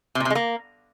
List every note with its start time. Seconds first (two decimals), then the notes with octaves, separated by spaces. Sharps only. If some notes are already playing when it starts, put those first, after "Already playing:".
0.15 C3
0.20 A#2
0.25 C3
0.30 G#3
0.35 A#3